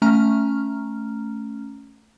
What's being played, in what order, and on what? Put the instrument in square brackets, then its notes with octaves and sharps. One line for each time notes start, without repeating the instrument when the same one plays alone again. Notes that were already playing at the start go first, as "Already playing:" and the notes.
[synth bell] A3 C#4 A#5 F6